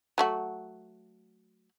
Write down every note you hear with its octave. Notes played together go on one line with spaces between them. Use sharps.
F#3 A3 F#4